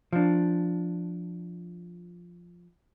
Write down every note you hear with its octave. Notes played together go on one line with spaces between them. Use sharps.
F3 D4